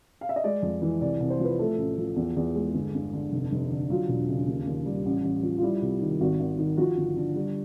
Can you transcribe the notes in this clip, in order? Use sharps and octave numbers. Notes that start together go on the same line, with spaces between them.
F5
E5
D#5
G#3 D5
F2
E3
C2 D5
C2
C5
F3 B4
A3 A4
A1
F3
E2
E2
G#3
G1
G1
D3
F1
F1
D3
F#3 F4
E1
C#3
D#2
D#2
G3
A1
A1
F3
F4
G3 E4
C2
D#3
G#1 F#4
G#1
D#3
F3 F#4
G1
D3
G3